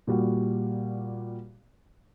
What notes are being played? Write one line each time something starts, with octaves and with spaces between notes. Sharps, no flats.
A#2 G3 F#4